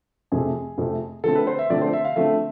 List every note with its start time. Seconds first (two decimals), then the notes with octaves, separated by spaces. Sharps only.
0.32 F2 C3 F3 A3 G#4
0.78 F2 C3 F3 A3
1.24 D3 F3 A3 C4 A4
1.35 B4
1.47 C5
1.59 E5
1.70 D3 F3 A3 C4 D5
1.82 C5
1.93 E5
2.05 F5
2.16 D3 F3 A3 C4 E5